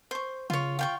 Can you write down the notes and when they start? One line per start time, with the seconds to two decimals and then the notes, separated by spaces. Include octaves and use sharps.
0.11 C5 C#6
0.50 C#3 F4 C#5
0.79 F4 G5 C#6